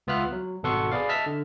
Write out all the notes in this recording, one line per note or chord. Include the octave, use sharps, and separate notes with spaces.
C#2 B3 F4 E5 F6 F#6
F#3
G#1 B2 A4 F#5 C6 C#6
G#4 B4 D5 F5
D#5 E5 A5 F6 B6
D3